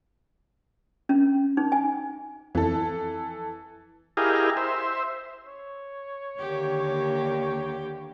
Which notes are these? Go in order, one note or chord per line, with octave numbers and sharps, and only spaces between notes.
C#4
D#4
G#5
F2 E3 A4
E4 G4 G#4 A#4 D#5 F5
C5 E5
C#5
D#2 D3 A#3 G4